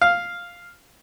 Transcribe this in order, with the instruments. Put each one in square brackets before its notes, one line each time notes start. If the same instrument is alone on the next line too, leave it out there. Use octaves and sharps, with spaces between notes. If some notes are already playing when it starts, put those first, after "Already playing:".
[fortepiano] F5